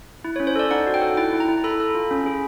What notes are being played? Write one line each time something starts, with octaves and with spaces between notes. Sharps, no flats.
E4
C#4 C#5
C5
A4 D5
D#4 F#5
F#4
G5
A4
E4 G5
E4
A#5
E4
A4 B5
A4
F4
C#4
G#4